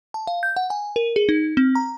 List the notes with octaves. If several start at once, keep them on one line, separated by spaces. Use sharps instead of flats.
A5
F5
G6
F#5
G#5
A#4
G#4
D#4
C4
A#5